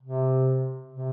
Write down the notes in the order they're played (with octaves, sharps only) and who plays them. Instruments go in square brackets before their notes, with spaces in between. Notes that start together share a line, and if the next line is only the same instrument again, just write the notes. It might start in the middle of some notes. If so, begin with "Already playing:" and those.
[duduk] C3
C3